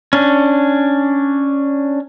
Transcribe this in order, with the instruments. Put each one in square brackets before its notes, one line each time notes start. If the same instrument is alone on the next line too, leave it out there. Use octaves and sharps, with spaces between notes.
[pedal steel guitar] C#4 D4